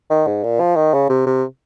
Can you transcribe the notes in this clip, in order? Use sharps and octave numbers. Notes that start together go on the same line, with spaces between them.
D#3
G#2
A#2
F3
D#3
C#3
C3
C3